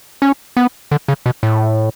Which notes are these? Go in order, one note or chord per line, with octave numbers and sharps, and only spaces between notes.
C#4
B3
D3
C#3
B2
A2